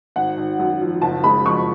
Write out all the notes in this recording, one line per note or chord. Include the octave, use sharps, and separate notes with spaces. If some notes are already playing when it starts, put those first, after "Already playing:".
G#1 F#5
G#1
F#2
F3
F#1 A5
G#3 B5
F2 C#6